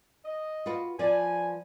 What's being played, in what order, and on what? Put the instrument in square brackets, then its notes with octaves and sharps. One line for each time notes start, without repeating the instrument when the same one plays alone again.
[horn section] D#5
[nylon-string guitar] F4 F#4 B4
[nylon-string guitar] F3 B3 D5 [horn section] G#5